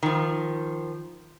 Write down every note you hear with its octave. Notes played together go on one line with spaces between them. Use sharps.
D#3 F3